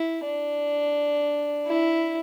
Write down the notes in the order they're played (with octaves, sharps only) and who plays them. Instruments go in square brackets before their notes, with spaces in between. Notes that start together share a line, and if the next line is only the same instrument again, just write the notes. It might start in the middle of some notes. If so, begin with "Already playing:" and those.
Already playing: [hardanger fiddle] E4
D4
E4